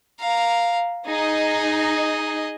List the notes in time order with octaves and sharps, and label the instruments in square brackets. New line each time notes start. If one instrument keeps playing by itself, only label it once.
[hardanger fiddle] F5 A#5
[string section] D#4 [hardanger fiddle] G#4 D#5